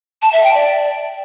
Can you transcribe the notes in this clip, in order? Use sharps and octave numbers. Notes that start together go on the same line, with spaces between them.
A5
E5
G5
D5